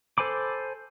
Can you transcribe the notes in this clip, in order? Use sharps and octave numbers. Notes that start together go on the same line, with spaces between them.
A4 C5 G#5 B5 D6